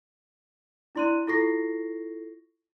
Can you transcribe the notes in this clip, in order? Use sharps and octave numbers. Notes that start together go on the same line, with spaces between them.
D4 E4 D5 C6 F#6 D#7
E4 F4 A4 C#6 A#6 C7